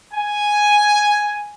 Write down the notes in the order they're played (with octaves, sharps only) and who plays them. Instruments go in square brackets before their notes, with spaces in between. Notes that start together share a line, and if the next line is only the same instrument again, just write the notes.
[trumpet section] G#5